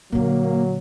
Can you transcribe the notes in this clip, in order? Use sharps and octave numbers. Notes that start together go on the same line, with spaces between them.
A#2 D3 F#3 A#3